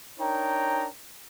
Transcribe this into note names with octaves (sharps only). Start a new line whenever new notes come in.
D4 D#4 A#4 C#5 G5 A#5